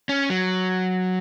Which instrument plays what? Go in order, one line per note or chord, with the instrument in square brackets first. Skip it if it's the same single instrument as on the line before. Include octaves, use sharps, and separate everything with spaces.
[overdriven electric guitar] C#4
F#3